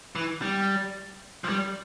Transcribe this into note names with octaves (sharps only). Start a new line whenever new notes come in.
E3
G3
F3
G3